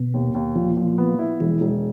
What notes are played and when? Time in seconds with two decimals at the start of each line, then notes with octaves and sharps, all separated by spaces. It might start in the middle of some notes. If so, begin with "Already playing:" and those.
Already playing: B2
0.14 D#2
0.35 D#2
0.56 A#2 F3
0.77 A#2
0.98 B3
1.19 E4
1.40 E1 E3
1.61 E1